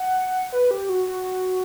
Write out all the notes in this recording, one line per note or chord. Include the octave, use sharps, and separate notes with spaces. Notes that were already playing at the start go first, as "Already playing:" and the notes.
Already playing: F#5
B4
G4
F#4
F#4